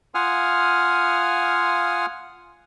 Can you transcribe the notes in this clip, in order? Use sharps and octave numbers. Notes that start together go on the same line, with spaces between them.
F4 F5 F#5 G#5 D#6 F6